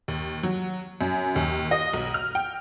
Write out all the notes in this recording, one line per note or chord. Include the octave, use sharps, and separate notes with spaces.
D#2
F#3
F#2
D#2
D#5
B1
F6
G5